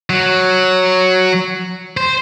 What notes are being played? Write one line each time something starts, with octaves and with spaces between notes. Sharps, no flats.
F#3
C5